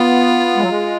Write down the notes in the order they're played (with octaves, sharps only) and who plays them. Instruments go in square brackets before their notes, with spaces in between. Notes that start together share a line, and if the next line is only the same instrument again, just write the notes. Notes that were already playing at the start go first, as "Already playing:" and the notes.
Already playing: [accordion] B3 [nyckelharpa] F4
[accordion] G#3
F#3
G#3